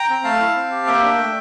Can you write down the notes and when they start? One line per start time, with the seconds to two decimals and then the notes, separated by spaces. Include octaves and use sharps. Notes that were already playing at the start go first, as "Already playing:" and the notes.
Already playing: G5 A#5
0.09 C4
0.24 A3 F5 A5
0.40 E4
0.55 C4
0.71 G4
0.86 A#3 E5 G5
1.03 D4
1.18 A3